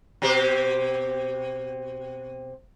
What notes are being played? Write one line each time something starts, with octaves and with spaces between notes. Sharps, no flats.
B2 C4 G4